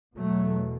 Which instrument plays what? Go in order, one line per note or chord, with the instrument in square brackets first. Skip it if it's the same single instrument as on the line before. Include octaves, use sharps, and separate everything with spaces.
[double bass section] E2 B2 F#3 A3